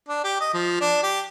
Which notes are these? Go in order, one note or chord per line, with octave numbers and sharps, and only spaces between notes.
D4
G4
D#5
F3
D4
G4